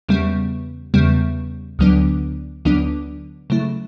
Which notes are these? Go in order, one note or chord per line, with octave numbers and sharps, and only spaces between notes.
E2 C#3 G3 B3
E2 C#3 G3 B3
D2 D3 F#3 B3 D4
D2 D3 F#3 B3 D4
C#3 F#3 A3 E4